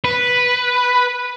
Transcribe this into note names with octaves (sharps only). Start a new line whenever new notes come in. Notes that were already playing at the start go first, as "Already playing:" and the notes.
B4